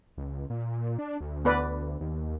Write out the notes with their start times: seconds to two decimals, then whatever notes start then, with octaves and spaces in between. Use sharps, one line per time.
0.18 C#2
0.50 A#2
0.99 D4
1.21 D2
1.45 B3 B4 D5
2.01 D#2